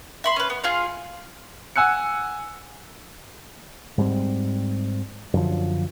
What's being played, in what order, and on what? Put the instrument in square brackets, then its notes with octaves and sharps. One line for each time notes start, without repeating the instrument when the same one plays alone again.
[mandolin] E5 B5 C6
C#4 B4
B3
F4 G#4 F5
[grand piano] F#5 G#5 E6 F#6 C#7
[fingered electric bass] G#2 G3 C4
F#2 D3 F3